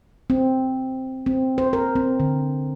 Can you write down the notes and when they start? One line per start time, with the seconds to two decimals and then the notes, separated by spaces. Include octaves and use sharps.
0.30 C4
1.26 C4
1.58 C5
1.73 A#4
1.96 C4
2.20 D3